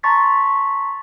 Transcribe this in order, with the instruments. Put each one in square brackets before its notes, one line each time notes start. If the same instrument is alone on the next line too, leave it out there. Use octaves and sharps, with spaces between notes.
[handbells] A5 A#5 C6 C#6 A6 B6